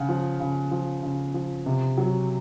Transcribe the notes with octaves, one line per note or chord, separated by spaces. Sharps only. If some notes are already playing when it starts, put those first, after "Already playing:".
Already playing: C#3 F#5
F3
C#3
F3
C#3
F3
C3
F#3